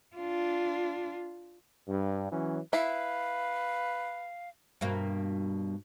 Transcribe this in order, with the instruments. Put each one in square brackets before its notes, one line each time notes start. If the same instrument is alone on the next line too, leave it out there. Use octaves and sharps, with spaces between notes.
[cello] D4 F4
[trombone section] G2
E3 F#3 C#4
[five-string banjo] E4 [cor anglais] B4 [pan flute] F5
[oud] G2 B2 A#3